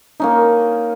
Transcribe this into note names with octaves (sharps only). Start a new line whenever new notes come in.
A#3 C#4 D#4